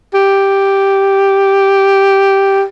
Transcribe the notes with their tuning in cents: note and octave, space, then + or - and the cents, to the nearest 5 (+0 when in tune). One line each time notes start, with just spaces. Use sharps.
G4 +0